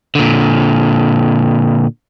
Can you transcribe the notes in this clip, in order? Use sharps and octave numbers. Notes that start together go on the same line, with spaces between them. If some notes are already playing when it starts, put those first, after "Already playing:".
A#2 D3